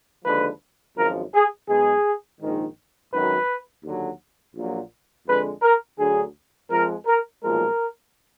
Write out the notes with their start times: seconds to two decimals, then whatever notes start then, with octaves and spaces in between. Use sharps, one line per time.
0.25 D#2 D3 F3 G#3 B4
0.96 G#1 F#2 F3 G#3 A#4
1.33 G#4
1.68 B1 B2 G#3 G#4
2.41 A#1 G#2 D#3
3.12 G#1 F#2 D#3 F#3 B4
3.83 D#2 D3 F#3
4.55 A#1 A#2 F#3
5.27 F2 D3 G#3 B4
5.62 A#4
5.98 D2 D3 F#3 G#4
6.70 F2 F3 G#3 A#4
7.06 A#4
7.43 B1 A#2 F3 G#3 A#4